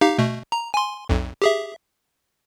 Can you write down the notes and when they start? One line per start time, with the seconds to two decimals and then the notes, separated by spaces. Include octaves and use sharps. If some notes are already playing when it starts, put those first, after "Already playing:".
0.01 D#4 G4 F5
0.18 B2 A3
0.52 A#5
0.74 G#5 C6
1.09 B1 F2
1.42 G4 G#4 E5